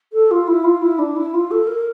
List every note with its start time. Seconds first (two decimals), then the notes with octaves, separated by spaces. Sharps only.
0.13 A4
0.31 F4
0.48 E4
0.64 F4
0.82 E4
0.99 D4
1.16 E4
1.34 F4
1.51 A4
1.67 A#4